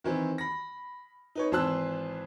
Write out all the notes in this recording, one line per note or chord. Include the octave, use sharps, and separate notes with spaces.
D#3 E3 C4
B5 A#6
D#4 B4 C#5
G#1 E3 C5 A5 E6 F#6